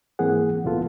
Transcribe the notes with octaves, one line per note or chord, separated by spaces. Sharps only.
G#2 E3 A#3 C4 G#4 F#5
C#2 A#2 E3 B3 F4 A4